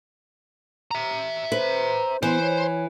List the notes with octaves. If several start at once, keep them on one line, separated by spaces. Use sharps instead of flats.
E5 A#5
B4 C5
E3 B3 C5
C#5